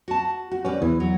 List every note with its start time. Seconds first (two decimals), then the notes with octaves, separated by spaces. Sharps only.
0.08 F#4 A5
0.51 F#4
0.65 G3 C#4 B4 D5
0.82 E2 E3
1.00 F#3